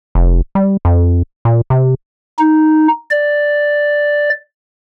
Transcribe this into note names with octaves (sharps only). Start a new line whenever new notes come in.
F1
G3
F2
A#2
C3
D#4
D5